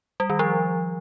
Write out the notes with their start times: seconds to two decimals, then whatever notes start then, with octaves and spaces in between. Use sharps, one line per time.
0.20 G3
0.30 D#3
0.39 F3